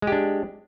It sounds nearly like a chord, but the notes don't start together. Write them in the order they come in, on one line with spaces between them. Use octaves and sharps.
G#3 G4 D4